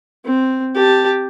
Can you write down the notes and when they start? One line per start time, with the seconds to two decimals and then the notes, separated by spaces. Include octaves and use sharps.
0.25 C4
0.75 G4 A5